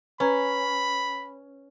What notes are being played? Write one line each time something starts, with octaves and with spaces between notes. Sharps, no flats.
C#4 B4 A#5 B5 G#6